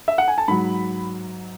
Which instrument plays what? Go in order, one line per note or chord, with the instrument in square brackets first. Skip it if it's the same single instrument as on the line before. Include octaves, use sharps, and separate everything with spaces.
[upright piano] E5
F#5
G#5
A5
G#2 F#3 B5